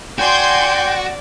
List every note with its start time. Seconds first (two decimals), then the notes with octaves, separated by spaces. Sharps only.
0.18 F#4 D5 G5 G#5 C6 G6